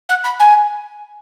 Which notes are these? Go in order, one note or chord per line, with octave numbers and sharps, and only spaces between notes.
F#5
B5
G#5